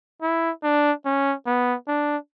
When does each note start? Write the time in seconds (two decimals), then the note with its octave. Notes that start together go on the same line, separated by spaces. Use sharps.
0.22 E4
0.63 D4
1.05 C#4
1.47 B3
1.88 D4